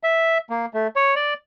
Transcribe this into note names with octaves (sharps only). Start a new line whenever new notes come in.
E5
A#3
A3
C#5
D5